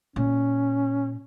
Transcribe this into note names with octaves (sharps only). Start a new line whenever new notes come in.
A#2 C#4